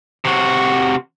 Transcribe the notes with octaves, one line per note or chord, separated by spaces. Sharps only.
C3 F#4